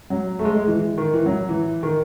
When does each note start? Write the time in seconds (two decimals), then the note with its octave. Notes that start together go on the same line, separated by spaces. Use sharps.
0.10 F#3
0.39 A3
0.45 G#3
0.57 G#3
0.68 E3
0.79 E3
0.98 D#3
1.14 E3
1.26 F#3
1.49 E3
1.83 D#3